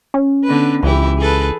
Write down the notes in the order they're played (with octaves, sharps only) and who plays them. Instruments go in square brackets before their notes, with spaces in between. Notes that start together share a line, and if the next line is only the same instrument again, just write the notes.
[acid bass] C#4
[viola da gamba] D3 B3 B4
[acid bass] C#2 [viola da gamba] E3 E4 G4
[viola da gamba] G#4 A4 B4